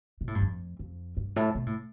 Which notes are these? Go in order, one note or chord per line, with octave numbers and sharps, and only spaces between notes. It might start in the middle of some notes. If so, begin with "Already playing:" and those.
B2
A2
G2
F2
F2
G2
A2
B2
A2